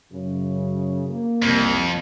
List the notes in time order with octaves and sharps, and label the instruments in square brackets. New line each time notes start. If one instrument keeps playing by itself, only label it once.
[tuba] F#2 [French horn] C#3
[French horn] A#3
[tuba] C2 [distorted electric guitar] F2